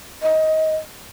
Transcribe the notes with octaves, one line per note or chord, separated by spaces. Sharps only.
D#5